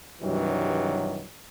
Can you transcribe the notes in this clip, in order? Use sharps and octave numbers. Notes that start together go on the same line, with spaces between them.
C2 G2 D#3 E3 F#3